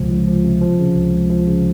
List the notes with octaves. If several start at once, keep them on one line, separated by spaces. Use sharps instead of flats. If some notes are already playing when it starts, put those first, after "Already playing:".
Already playing: C#2 C3 F3
C#2
F3
C3
F3
C#3
C#2
C#2
F3
C#3